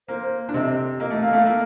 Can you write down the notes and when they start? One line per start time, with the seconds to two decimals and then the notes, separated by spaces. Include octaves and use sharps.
0.08 A#3 C5
0.49 D4
0.54 C3 C4 D#5
1.00 A#3 D#5
1.10 A3
1.22 A#3 F5
1.33 A3
1.45 A#3